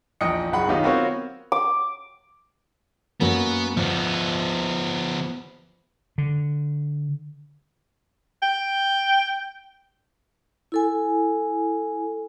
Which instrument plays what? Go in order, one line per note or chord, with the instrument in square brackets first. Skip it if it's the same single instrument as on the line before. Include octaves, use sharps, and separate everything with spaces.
[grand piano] A#1 E2 D#5 G5 D#6 C#7
F#1 B1 F#2 G#4 F#5 B5
D#3 F#3 B3 D#4 F4 G4
B3 C4 F4 F#4 A#4 C#5
[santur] D6
[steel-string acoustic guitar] F#2 A#3 F#4 [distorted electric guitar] B3
[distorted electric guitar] F3 B3 [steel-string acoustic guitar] C5
[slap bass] D3
[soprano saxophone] G5
[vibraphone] E4 A4 G#5